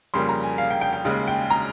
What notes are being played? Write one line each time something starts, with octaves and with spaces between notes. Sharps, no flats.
F2 C#3 G3 A#3 C6
A#5
G#5
F5
G5
G5
G5
D#2 C#3 G#3
G5
A#5